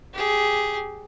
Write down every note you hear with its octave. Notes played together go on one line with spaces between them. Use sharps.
G4 G#4